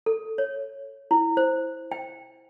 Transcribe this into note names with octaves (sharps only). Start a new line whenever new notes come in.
A4
C#5
E4
C5
G5